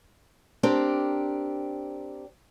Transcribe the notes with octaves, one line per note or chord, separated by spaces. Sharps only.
C4 D4 G4 A#4